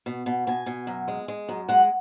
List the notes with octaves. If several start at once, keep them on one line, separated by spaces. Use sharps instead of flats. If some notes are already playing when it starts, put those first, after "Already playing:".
B2
B2
B2 G#5
B2
F#2
G#3
G#3
F#2
G#3 F#5